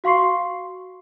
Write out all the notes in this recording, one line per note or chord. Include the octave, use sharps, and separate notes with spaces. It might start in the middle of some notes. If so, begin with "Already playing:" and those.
F#4 F5 C6 C#6 C7